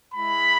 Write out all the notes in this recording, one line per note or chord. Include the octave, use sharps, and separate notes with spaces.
G#3 E4 B5